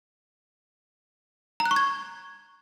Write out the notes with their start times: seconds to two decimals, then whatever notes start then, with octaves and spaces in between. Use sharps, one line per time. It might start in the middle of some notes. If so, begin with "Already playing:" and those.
1.60 A#5
1.66 F#6
1.71 C#6
1.76 G#6